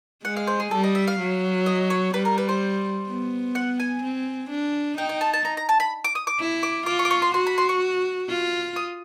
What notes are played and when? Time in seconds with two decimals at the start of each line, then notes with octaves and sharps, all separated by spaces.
0.24 G#3 F#5
0.37 F5
0.47 C5
0.60 G#4
0.71 G3 A4
0.83 D#5
0.95 E5
1.07 F5
1.19 F#3
1.66 D#5
1.90 C#5
2.14 G3 B4
2.25 A#4
2.38 B4
2.49 C5
3.08 B3
3.55 F#5
3.80 G#5
4.03 C4
4.50 D4
4.98 D#4 G5
5.09 G5
5.21 A5
5.33 A5
5.45 A#5
5.57 A#5
5.69 A5
5.80 B5
6.04 D6
6.15 D#6
6.27 D6
6.40 E4
6.63 D6
6.86 F4 D6
6.99 C#6
7.05 D6
7.11 C#6
7.22 C6
7.34 F#4 C6
7.47 B5
7.58 C6
7.69 C#6
8.29 F4
8.76 D#6